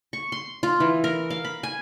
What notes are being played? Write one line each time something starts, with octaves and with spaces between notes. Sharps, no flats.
C#6
C6
F4
E3
A#4
F5
B5
G#5